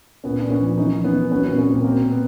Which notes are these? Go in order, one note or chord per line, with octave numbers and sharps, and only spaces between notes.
A#2 B3 C#4
A#2 D4
B3 C#4
F3
E3 C#4 D#4
E3
B3 C#4
E3
F#3 B3 C#4
B3 C#4
A#2
B3 C#4
A#2 A#3 C4
B2 A#3 C4
B2
B3